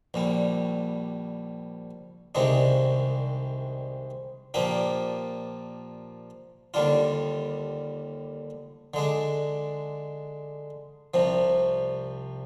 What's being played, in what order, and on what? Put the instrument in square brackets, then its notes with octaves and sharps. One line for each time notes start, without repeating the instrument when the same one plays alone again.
[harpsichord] A#1 A#2 G3
C2 C3 D#3 G#3 D4
A#2 F3 A#3 D4 G4
D#2 D3 G3 D4 F4
D3 G#3 D4
C2 C3 F3